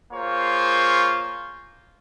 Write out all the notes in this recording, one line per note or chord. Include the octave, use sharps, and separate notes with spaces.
A#3 F4 G#4 C5 C#5